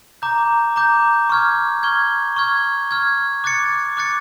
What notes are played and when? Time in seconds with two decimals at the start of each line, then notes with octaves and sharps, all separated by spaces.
0.22 A#5 D6 G6
0.76 A#5 D6 G6
1.29 C#6 F6 G#6
1.83 C#6 F6 G#6
2.36 C#6 F6 G#6
2.91 C#6 F6 G#6
3.44 D6 F#6 A6 C#7
3.97 D6 F#6 A6 C#7